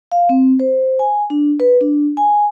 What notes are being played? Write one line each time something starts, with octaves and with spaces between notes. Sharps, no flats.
F5
C4
C5
G#5
D4
B4
D4
G#5